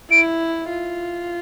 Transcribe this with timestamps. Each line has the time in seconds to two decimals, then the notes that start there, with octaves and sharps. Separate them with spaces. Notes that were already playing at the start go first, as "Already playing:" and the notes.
0.10 E4 D7
0.69 F4